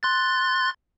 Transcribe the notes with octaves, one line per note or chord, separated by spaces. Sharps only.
C6 F#6 A6